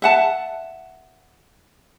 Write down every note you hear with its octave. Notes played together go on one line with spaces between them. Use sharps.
E5 F#5 A5